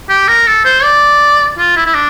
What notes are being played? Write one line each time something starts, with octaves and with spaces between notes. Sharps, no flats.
G4
A#4
A4
C5
D5
F4
E4
E4
D4